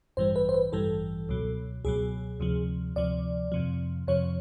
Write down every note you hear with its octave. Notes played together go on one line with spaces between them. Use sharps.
A1 G2 E3 G3 C5
B4
C5
B4
A1 G2 E3 G3 A4
C#2 B2 F#3
C#2 B2 F#3 G#4
D2 C3 F3
D2 C3 F3 D5
F2 C3 F3
F2 C3 F3 C#5